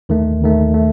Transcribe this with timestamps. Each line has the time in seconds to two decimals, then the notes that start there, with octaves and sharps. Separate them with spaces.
0.09 D#2 D#3 A3
0.42 D#2 D#3 A3
0.74 A3